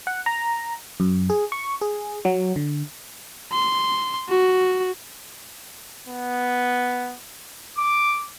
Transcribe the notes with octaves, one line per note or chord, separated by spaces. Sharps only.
F#5
A#5
F#2
G#4
C#6
G#4
F#3
D3
C6
F#4
B3
D6